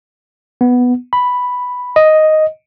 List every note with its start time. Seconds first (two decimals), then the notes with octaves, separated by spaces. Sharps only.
0.61 B3
1.13 B5
1.96 D#5